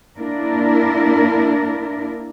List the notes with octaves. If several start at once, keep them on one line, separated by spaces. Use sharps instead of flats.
A#3 D4 E4 A#4 D5